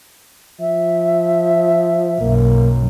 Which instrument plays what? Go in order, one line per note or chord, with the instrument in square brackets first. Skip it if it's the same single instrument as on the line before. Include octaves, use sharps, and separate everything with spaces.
[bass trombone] F3 [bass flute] E5
[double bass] B1 F#2 [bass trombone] A#3